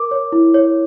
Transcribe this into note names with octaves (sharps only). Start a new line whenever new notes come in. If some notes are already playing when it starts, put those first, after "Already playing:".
Already playing: A#4 D6
C#5
E4
C#5